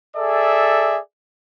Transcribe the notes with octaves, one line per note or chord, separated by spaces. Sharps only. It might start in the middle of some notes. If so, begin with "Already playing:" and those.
G#4 A4 D5 E5